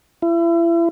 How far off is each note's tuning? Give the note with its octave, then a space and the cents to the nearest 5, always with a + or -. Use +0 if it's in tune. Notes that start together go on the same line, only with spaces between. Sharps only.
E4 +35